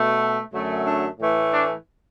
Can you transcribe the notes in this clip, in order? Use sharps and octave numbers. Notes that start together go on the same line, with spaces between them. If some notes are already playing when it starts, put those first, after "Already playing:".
Already playing: B2 A3
F#2 D3 F#3 A3
D4
A2 E3 A3
D4